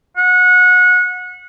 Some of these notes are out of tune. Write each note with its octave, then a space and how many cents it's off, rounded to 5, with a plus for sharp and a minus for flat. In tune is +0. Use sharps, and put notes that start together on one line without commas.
F#5 -25